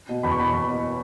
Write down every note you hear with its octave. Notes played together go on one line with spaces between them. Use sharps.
B2
E2 B5
C#6
B2 B5
E2
B2